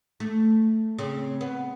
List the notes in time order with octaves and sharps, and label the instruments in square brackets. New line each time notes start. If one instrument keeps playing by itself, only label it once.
[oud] A3
C#3 C4
B3